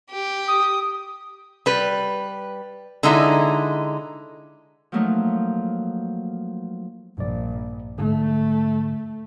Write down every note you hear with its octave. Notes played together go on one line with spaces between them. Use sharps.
G4
D#6
G3 B4
D3 G#3 D#4 E4
F3 F#3 A3 A#3 D#4
A#1 G2 D5
G#2 D3 A3